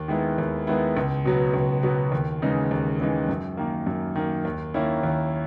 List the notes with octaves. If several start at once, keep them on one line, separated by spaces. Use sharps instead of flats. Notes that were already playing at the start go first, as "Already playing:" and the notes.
Already playing: D#2
D#3 G#3 B3 E4
D#2
D#3 G#3 B3 E4
C#2
B2 F#3 B3
C#2
B2 F#3 B3
D#2
C#3 E3 G#3 D#4
D#2
C#3 E3 G#3 D#4
F#2
D#3 A#3
F#2
D#3 A#3
D#2
D#3 A#3 C#4 E4
D#2